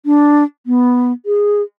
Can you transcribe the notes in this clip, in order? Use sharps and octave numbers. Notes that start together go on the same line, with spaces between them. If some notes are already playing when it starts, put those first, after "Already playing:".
D4
B3
G#4